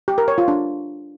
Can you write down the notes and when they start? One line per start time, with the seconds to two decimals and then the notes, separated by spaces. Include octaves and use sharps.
0.08 G4
0.18 A#4
0.28 C#5
0.38 F4
0.48 D4